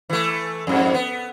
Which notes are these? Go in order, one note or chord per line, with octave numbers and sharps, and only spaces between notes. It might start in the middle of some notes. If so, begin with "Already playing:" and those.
E3 A3
F2 G#2
B3